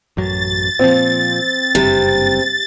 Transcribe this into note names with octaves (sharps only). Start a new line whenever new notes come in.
A1 F#2 F#3 A6
A#2 F3 C4
F#1 G2 C3 G3